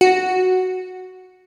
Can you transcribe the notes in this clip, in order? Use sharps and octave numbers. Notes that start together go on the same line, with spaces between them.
F#4